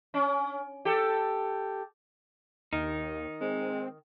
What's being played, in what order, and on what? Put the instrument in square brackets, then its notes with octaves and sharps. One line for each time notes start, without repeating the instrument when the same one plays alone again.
[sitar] C#4
G4 A4
[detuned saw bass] D#2 [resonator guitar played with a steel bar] D#3 [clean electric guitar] D#4
[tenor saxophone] G#3 [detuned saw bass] C4